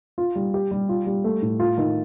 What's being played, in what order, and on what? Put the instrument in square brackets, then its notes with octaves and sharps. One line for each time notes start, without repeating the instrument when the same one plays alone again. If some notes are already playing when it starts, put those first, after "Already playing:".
[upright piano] F4
G3
G4
G3
F4
G3
A3
A2
F4
D#3